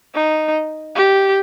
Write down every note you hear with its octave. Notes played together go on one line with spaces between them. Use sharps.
D#4
G4